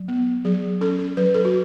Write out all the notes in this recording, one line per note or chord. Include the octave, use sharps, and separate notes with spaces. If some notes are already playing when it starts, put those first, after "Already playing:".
Already playing: F#3
B3
F#3 G#4
C#4 A4
A4
F#3 B4
A4
F#4